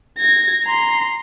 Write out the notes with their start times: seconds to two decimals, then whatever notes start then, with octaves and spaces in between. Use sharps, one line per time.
0.18 G#6 A#6
0.65 A#5 C6